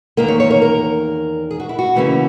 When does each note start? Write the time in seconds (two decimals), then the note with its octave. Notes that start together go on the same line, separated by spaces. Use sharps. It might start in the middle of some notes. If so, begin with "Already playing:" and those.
0.17 E2 D#3 A#3 A#4
0.28 C#5
0.40 C#5
0.51 A#4
0.62 A#4
1.51 G#4
1.60 F#4
1.69 E4
1.79 F#4
1.95 D#2 C#3 E3 A#3 C#4